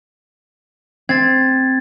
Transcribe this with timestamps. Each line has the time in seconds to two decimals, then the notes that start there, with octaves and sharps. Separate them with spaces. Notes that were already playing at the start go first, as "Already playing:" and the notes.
1.09 C4 G#6 A6